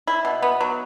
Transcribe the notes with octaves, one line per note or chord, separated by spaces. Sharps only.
E4
B2
B3
F#3